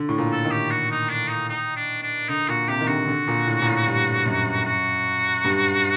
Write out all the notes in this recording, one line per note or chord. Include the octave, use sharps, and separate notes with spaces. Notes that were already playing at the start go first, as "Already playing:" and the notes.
Already playing: D3
A2
A#2
A4
D#3
G4
F#4
D#4
D4
D#4
D#4
D4
D4
D3 D#4
A#2 F#4
C3 G4
D#3
D3 F#4
D3
A#2
A2
A#2
A2
G2
F#2
F#4
G2